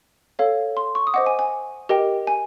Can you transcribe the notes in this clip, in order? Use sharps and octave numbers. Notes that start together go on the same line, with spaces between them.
A4 C#5 F5
C6
C#6
D#6
C5 D#5 F#5 D6
G#5
G#5
G4 A#4 D#5 G5
G#5